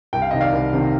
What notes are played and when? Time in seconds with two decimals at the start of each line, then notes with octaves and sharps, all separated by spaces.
0.13 C2 G5
0.22 F5
0.31 C3 D#3 D#5
0.40 D5 F5
0.53 C2
0.73 C3 D#3